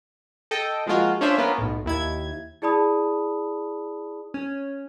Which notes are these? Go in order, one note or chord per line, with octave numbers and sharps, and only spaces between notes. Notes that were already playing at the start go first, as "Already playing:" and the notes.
A4 D#5 G5
F3 G#3 A#3 F4 F#4
C#4 D4 F4 C5 E5
A#3 B3 C#4 F4
B1 A2
D#2 E4 G#6
E4 G#4 D5 A5 B5 D#6
C#4